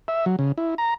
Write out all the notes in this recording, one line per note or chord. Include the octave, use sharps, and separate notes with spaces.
E5
F#3
C#3
E4
A#5